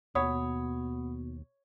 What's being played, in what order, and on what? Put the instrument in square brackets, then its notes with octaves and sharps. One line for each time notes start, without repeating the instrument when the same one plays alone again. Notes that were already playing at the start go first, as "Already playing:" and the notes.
[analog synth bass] D#2 [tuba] B2 [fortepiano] C#5 [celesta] F#5 B5 D#6